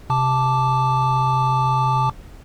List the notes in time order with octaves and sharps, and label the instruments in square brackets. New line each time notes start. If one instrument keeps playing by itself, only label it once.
[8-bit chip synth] C3 A5 D6